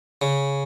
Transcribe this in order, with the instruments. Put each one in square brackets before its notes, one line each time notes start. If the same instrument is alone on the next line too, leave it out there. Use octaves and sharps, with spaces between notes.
[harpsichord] C#3